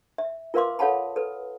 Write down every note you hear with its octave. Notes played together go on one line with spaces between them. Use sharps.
E5
F4 A#4 B4 F5 C6 D6
A4 C#5 F5 F#5 A5 B5
A4 B4